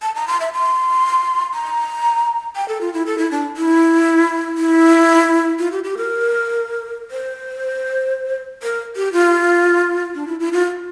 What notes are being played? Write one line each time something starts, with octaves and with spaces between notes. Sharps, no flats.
A5
A#5
C6
E5
C6
A#5
G5
A4
F4
E4
A4
E4
D4
E4
E4
F4
G4
G4
A#4
C5
A#4
G4
F4
D4
E4
E4
F4